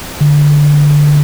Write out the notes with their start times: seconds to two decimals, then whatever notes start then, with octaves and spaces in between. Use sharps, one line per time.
0.21 D3